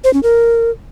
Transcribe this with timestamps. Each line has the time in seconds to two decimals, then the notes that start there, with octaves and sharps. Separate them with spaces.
0.04 C5
0.14 C#4
0.23 A#4